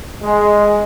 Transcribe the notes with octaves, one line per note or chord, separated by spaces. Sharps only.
G#3